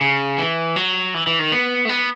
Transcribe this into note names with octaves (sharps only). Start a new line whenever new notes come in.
C#3
E3
F#3
E3
E3
D#3
B3
A3
B3